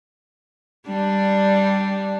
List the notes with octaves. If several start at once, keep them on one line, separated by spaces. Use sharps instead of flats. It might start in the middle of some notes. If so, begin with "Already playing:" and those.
G3 D4